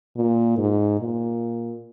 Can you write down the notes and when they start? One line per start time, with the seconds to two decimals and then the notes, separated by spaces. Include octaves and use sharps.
0.16 A#2
0.58 G#2
0.99 A#2